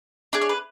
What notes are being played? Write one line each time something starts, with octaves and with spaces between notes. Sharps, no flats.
D4 G#4 D5
C#5
B4